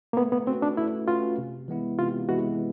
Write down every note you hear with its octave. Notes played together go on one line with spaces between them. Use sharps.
A#3
A3 B3
B3
C4 C#4 F#4 B4
D4
A3 E4
C#4 F4 F#4 B4
C3
E3 G#3 B3 E4
C3 F4
E3 G#3 B3 E4 F#4